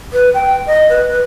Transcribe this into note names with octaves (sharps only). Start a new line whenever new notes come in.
B4
G5
D#5
B4
B4